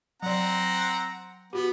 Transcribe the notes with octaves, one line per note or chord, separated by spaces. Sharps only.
F#3 C4 D5 F#5 A#5
B3 F#4 G4